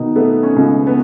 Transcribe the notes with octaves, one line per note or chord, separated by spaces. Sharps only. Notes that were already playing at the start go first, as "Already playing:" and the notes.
Already playing: B2 D#3 D#4
A3 B3
C#4
C#2
B3